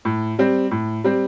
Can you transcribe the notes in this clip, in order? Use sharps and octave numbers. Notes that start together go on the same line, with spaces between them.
A2
G3 C4
A2
G3 C4